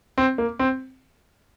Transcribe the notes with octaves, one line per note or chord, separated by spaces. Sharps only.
C4
A#3
C4